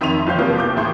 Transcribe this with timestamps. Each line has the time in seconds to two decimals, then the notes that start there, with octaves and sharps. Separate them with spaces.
0.01 F2 D#3 E5 C6 D#7 F7
0.27 F#1 F3 C5 F5 G6
0.38 C3 E3 F3 A#3 B3 F4
0.56 D#2 D6 G6
0.77 D#2 A2 E3 E4 G#4 C6